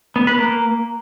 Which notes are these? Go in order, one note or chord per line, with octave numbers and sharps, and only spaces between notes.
B3
B4
A#3